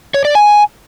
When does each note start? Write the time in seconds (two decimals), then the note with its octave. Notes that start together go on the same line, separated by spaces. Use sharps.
0.14 C#5
0.25 D5
0.35 G#5